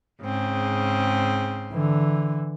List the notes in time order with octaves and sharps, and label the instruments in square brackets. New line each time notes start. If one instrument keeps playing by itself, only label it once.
[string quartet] G#2 C#3 C4
[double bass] D3 E3